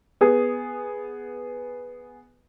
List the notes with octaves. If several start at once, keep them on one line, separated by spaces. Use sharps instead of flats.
B3 G#4